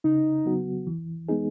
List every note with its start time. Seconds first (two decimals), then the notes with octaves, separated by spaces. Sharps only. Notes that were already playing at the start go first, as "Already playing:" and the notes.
0.04 C#3 D#4
0.45 F#3 B3 F#4
0.87 E3
1.29 G#3 B3 D#4 G#4